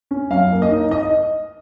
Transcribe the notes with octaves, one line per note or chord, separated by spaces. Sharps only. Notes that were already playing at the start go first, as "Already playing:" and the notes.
C#4
F#2 F5
A#3
D#5
D#4
D#5